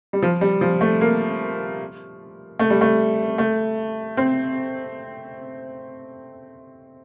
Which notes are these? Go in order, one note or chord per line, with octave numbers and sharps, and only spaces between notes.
G3
F3
G3
F3
A3
A#3
A3
G3
A3
A3
C4